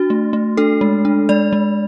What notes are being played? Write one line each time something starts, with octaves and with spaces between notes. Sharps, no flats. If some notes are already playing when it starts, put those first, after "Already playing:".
Already playing: D4 F#4
A3
A3
D4 A4
G#3
D4
G#3 D5
G#3